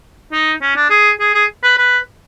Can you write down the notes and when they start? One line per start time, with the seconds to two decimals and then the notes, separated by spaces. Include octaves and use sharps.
0.32 D#4
0.62 C#4
0.76 D4
0.90 G#4
1.20 G#4
1.34 G#4
1.63 B4
1.78 B4